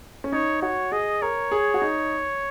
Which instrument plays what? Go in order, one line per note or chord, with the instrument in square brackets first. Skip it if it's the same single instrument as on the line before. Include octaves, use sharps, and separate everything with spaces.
[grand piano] C#4
[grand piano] D#4 [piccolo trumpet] C#5
[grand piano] F#4 [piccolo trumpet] C#5
[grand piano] G#4 [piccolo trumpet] D#5
[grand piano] A#4 [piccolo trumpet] C#5
[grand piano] G#4
F#4
D#4